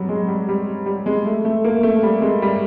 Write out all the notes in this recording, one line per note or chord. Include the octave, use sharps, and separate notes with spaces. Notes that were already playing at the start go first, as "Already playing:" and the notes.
Already playing: F#3 G3
G#3
G3
G3
G3
G#3
A3
A3
A#3
A3
G3
G#3
G3